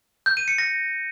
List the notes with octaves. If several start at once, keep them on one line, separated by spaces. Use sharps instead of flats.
G6
D#7
C#7
A#6